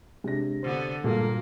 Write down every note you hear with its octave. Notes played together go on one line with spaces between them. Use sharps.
C3 G#3 D4 A#6
D3 B3 C5
G2 A#2 G#3 A#3 F#4 A4